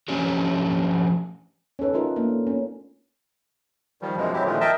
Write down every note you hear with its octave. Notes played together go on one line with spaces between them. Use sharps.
F3 A3 C#4 D4 G4
C#4 D#4 A4 B4
A3 D#4 F4 A#4 B4
A3 A#3 D4
B3 C#4
D#3 F3 G3
F#2 B2 E3 F3 G#3
F#3 G#3 C4 E4 G4
A#2 D3 D#3 F3 G#3 A3
A#4 D#5 E5 G5 A5